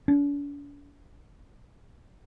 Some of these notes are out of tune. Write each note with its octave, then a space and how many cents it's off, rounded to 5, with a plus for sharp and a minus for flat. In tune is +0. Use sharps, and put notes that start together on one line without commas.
D4 -45